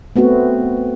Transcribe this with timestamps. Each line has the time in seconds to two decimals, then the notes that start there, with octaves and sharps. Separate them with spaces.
0.16 A3 B3 C4 F#4